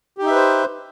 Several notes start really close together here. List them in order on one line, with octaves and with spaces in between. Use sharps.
G4 D#4 E5 B4 C5